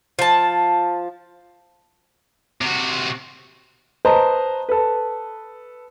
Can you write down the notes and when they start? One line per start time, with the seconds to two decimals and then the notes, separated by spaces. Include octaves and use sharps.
0.19 F3 A5
2.61 C3 F#4
4.05 B4 C5 D#5 A5 A#5
4.69 A4 B4